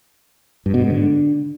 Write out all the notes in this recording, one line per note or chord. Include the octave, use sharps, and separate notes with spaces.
G2
B2
G#2
D3